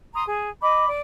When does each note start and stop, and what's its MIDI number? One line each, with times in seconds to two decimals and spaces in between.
0.15 0.24 82
0.15 0.24 84
0.15 0.24 87
0.28 0.51 68
0.62 0.88 75
0.62 0.88 83
0.62 0.88 86
0.88 1.01 74